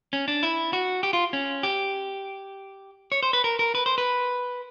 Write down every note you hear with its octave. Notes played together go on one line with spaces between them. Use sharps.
C#4
D4
E4
F#4
G4
F4
C#4
G4
C#5
C5
B4
A#4
A#4
B4
C5
B4